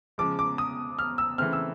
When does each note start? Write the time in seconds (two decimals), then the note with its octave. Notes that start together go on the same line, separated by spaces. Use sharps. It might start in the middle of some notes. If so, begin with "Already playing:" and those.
0.18 C#3 F3 G#3 D6
0.39 D6
0.58 D#6
0.99 F6
1.18 E6
1.38 C#3 E3 A3 C4 F6
1.53 E6